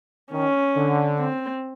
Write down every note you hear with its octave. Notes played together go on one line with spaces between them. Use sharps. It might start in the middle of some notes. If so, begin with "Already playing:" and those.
D#3 C#4
D3
C4